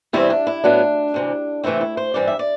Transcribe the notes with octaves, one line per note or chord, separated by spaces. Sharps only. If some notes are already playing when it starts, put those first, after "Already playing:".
E2 C3 G3 C4 E4
D4
E4
A2 F#3 B3 D4
D2 C3 E3
C3 E3 A3 C4 E4
E4
C5
G2 E3 G3 C4 D5
E5
D5